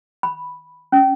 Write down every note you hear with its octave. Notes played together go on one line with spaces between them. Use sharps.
B5
C#4